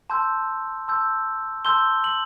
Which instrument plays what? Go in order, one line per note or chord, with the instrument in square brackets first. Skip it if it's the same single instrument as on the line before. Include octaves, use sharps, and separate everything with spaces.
[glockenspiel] A5 C6 E6 G6
A5 C6 E6 G6
A5 C6 E6 G6 G7
F#7